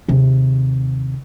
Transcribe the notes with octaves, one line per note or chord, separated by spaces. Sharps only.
D#2 C3